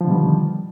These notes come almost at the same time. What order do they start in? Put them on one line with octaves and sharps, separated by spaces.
F3 D3 B2 G3 D#3